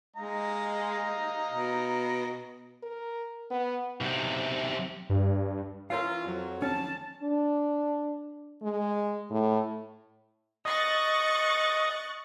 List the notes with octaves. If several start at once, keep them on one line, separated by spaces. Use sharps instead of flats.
G#3 D#5 F5 A#5
B2
A#4
B3
B1 C3
G2
E3 C#4 F4 A#4 C#5 F5
F2 F#3
C#4 A5
D4
G#3
A2
D#5 C#6 F#6 A6